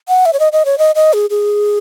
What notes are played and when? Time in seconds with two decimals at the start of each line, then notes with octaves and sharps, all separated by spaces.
0.08 F#5
0.25 E5
0.33 C#5
0.39 D#5
0.52 D#5
0.65 C#5
0.78 D#5
0.95 D#5
1.13 G#4
1.30 G#4